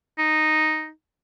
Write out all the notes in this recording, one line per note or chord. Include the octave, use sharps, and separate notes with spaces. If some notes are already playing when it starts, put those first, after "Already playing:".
D#4